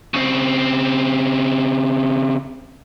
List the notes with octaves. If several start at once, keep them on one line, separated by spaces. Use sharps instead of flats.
C#3 C4